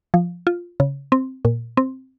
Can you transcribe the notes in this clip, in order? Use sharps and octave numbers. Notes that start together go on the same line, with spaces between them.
F3
F4
C#3
C4
A#2
C4